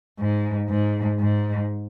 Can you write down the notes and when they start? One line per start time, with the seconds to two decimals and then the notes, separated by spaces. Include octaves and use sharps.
0.19 G#2
0.69 G#2
1.20 G#2